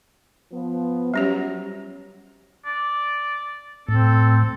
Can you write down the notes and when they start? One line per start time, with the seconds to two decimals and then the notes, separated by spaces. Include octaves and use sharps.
0.52 F3 B3
1.14 F#3 G3 C#4 G4
2.65 D5
3.89 A2 C4 A4